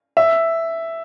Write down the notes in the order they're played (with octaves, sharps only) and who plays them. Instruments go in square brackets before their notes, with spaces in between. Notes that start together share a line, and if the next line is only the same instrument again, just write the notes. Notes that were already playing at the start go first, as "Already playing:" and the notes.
[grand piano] E5